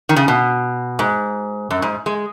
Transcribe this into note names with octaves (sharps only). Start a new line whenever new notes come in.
D#3
C#3
B2
G#2
F#2
G#2
G#3